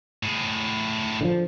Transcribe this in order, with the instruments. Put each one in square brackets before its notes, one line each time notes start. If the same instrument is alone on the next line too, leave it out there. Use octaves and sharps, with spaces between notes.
[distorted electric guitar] A2 G#4
[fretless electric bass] D3 E3 F3